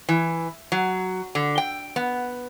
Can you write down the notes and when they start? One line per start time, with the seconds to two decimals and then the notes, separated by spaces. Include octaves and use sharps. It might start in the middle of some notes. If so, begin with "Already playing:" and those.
0.09 E3
0.72 F#3
1.35 D3
1.58 G5
1.96 B3